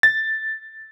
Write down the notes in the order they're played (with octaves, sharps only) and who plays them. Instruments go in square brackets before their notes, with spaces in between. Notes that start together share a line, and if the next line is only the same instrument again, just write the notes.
[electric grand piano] A6